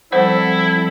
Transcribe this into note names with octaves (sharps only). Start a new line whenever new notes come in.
F3 G3 C4 E4 A4 C5 F#5